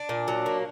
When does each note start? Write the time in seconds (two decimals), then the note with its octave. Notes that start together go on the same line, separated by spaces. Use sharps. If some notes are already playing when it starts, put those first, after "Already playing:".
Already playing: D4
0.09 A#2
0.28 F#3
0.46 A#3